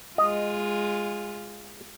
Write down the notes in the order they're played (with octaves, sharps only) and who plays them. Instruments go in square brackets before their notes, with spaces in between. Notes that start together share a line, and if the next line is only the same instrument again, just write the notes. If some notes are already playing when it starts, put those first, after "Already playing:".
[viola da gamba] G#3 F4 [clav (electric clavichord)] D#5